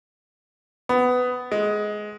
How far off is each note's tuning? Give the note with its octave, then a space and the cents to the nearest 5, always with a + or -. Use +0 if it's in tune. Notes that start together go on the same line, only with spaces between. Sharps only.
B3 +15
G#3 +15